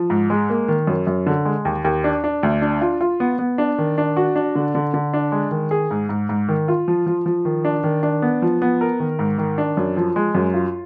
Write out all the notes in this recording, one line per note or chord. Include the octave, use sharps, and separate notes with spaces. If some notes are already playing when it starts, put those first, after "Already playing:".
Already playing: F3
G#2
G#3
A#3
D#3
F#2
F#2
D3
G#3
D#2
D#2
D4
D4
D2
D4
F4
F4
B3
B3
D4
D#3
D4
F#4
D4
D3
D3
D3
D4
G#3
D#3
G#4
G#2
G#2
G#2
D#3
F4
F3
F3
F3
D#3
D4
D#3
D4
B3
F3
B3
A#4
D#3
G#2
D#3
D4
F#2
F3
G#3
F#2
F4